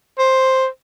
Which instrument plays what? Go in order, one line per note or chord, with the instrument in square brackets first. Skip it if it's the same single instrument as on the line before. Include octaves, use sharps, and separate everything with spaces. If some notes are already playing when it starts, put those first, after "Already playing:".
[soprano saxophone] C5